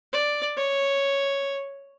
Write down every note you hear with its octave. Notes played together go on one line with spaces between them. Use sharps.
D5
C#5